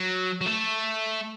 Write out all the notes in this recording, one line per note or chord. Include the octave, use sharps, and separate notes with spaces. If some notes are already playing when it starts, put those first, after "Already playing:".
Already playing: F#3
F#3
A3